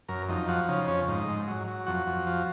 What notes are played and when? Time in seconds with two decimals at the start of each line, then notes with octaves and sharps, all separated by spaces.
0.09 F#2 A#4
0.29 F2 D#4
0.48 F3 F#4
0.68 C#3 D#4
0.88 F2 C#4
1.08 G#2 D#4
1.28 G#2
1.48 F#3
1.67 F#3
1.86 F2 F#4
2.07 F2
2.27 F3